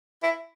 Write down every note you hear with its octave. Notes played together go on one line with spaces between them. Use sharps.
E4